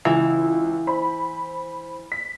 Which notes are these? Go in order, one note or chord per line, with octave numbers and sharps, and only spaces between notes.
C#2 E3
C5 B5
B6